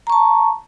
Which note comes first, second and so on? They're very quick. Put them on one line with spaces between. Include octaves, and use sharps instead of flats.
A#5 C#6 A5